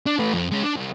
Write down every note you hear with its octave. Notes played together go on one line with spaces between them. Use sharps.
D4
A3 B4
F2
G#3 C#4
D4
C2